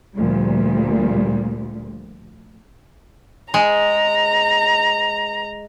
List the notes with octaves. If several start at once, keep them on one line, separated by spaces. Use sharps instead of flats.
D2 A#2 F3 G3
G#3 A#5